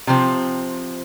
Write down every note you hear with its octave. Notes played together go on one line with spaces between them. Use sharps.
C3 F3 C4